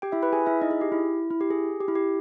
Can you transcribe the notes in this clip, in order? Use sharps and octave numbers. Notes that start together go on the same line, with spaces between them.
G4 G5
E4 E5
B4 B5
G#4 G#5
E4 E5
D#4 D#5
G#4
G4
E4
E4
G4
G#4
G4
E4
G4